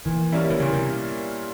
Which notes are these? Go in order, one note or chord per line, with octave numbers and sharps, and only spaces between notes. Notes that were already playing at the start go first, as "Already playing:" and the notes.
A#2 E3
G3 A#3 C#4 E4
E3
A#2 C#3
C3